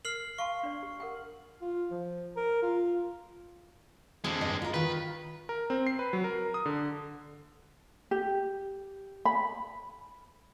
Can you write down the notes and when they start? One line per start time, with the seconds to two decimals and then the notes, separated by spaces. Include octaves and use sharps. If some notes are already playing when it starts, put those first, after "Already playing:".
0.05 A#4 F6 C7 F#7
0.38 F5 A5 C6 C#6
0.63 D4 D5
0.83 G4
1.00 A#4 F#5 G5
1.62 F4
1.91 F3
2.37 A#4
2.63 F4
4.24 D3 G#3 C4 F4
4.41 G2 D#5
4.62 F4 A#4
4.74 D#3 F4 B4
5.49 A#4
5.70 C4
5.87 C7
5.99 B4
6.13 F#3
6.24 A#4
6.54 D#6
6.66 D3
8.11 G4
9.25 B5